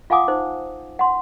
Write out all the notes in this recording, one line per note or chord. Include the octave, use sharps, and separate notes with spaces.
F4 F5 F#5 G#5 D6 D#6
D#4 C5
F#5 C6